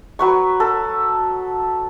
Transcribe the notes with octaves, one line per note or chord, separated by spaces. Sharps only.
F#3 B4 C#6
A4